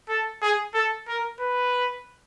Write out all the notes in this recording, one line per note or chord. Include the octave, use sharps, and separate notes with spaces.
A4
G#4
A4
A#4
B4